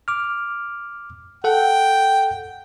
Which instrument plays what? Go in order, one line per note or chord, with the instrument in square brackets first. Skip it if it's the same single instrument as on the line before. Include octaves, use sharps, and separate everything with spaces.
[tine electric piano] D6 F6
[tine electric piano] A4 F#5 [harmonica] G5